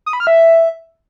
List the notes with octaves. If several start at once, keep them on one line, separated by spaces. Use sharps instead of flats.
D#6
B5
F6
E5